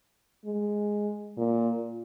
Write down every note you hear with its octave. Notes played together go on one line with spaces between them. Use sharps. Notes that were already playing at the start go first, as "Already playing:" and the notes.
G#3
A#2